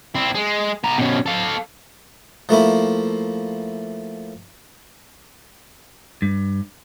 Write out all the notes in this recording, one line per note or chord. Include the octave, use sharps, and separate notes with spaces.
C4 E4
G#3
B3 A#5
B2 C#4
A4 F5
F3 A3 A#3 E4
G2